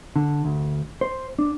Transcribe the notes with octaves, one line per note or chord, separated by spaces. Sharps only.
D3
D2
C5
D4